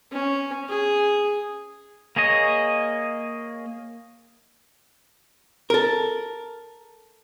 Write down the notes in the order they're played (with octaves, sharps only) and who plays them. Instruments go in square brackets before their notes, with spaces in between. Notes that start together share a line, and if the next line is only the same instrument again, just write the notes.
[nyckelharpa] C#4
G#4
[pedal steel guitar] A#3 G#4 C#5 D#5
[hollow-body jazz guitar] A4 A#4